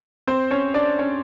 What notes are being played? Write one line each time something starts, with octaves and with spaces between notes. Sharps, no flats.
C4 C5
C#4 C#5
D4 D5
C#4 C#5